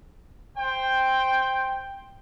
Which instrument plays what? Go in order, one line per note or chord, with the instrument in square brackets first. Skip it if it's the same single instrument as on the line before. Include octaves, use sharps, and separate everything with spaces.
[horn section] C5 G5